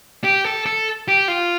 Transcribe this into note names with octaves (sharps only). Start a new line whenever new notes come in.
G4
A4
A4
G4
F4